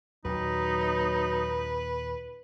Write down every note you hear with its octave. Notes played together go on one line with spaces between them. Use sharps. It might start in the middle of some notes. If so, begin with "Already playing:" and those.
D#2 A#2 F#3 D#4 B4